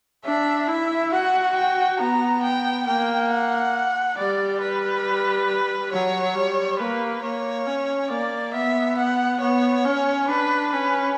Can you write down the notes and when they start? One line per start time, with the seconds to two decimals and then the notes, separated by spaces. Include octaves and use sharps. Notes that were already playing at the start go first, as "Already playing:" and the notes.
0.25 D4 E5
0.68 E4 E5
1.12 F#4 F#5
1.56 G5
1.99 B3 A#5
2.43 G5
2.87 A#3 G5
3.31 F#5
4.18 G3 D5
4.61 B4
5.92 F#3 C#5
6.35 G3
6.80 A#3 B4
7.23 A#3 C#5
7.67 C#4
8.10 A#3 D5
8.54 B3 E5
8.97 F#5
9.41 B3 C#5
9.85 C#4
10.28 D4 B4
10.72 C#4 B4